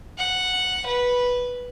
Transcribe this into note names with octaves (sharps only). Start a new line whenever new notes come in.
F#5
B4